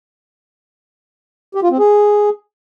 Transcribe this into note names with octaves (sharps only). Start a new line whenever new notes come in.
G4
F4
C4
G#4